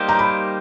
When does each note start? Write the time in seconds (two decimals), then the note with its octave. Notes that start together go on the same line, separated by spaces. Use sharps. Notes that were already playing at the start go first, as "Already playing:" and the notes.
Already playing: G3 A#3 D#4 G4 C5
0.09 A#5
0.19 B5